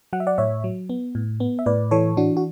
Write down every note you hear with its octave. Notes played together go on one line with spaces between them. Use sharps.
F#3 F#5
E5
D5 F#5
A2 C#5 E5
F#3
B3
A2
B3
E5
A2 B4 D5
E3 A4 C#5
E3 D4 F#4
F#4